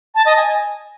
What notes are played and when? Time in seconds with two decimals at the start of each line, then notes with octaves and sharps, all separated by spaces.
0.15 A5
0.26 D#5
0.36 G#5